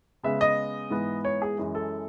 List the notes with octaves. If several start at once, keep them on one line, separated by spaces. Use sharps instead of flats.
C#3 G#3 B3 E5
D#5
G#2 E3 B3
C#5
G#4
F#2 E3 G#3
A4